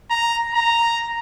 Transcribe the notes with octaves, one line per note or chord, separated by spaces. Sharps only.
A#5
A#5